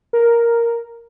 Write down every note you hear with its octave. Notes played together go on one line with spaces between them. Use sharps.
A#4